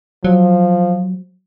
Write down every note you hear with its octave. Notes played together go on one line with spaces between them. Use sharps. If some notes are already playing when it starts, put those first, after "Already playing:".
F3 F#3